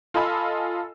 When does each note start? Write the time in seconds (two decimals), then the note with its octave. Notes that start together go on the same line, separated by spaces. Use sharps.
0.14 F4 A4 D#5 G#5 B5 E6